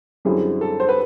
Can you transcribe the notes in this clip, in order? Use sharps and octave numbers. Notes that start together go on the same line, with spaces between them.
F#2 D3 G3 C4 E4 G#4
A4
C5
B4